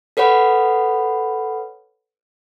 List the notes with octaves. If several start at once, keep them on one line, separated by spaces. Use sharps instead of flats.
A4 B4 C#5 F#5 B5